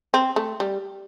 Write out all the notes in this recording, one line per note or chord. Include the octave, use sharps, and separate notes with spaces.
C4
A3
G3